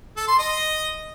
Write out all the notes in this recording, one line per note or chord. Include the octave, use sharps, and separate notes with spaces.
A4
C6
D#5